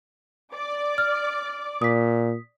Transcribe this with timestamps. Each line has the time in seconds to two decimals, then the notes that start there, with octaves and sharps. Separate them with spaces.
0.54 D5 D6
0.98 F6
1.82 A#2 D#6 B6